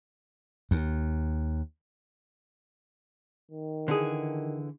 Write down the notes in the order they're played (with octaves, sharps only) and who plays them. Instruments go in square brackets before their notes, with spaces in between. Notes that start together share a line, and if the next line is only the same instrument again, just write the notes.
[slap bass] D#2
[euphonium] D#3
[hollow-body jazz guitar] D3 E3 G#4